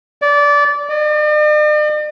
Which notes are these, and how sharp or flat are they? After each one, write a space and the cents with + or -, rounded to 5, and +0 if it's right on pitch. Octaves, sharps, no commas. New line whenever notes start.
D5 -20
D5 +45